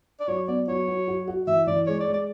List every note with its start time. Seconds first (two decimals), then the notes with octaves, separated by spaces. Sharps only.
0.20 D5
0.28 F#3 C#5
0.48 B3 D5
0.68 F#3 C#5
0.88 F#3
1.08 F#4
1.28 F#4
1.47 E3 E5
1.67 E3 D5
1.87 G#3 C#5
2.00 D5
2.07 G#3
2.14 D5